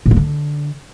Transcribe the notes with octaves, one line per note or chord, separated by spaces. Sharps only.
A#2
A#3
D3